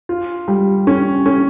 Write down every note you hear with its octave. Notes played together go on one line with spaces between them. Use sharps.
F4
G3
C#4
C#4